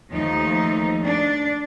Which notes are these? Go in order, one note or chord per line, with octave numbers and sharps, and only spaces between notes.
D#2 F3 A3 D#4
D4